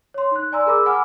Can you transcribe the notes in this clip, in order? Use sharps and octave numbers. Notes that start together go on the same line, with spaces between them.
C#5 C6
D#4 F#6
D5 G#5 A#5 C6 E6
G#4 A#4 B5 D6 E6
F#5 G#5 B5 D6 E6 F6